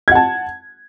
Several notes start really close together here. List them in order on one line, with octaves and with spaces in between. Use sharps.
G#6 F#5 A5